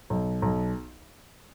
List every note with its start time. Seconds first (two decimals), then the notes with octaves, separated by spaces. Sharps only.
0.10 B1
0.42 B1